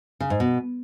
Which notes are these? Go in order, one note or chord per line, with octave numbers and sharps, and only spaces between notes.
C#3
G#2
B2